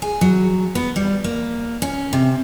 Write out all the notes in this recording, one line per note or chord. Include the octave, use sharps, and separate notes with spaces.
G#4
F#3
B3
G3
A#3
C#4
C3